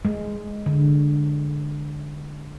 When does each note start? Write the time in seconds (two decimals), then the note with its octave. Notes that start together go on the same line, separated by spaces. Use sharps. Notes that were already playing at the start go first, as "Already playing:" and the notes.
0.05 G#3
0.66 D3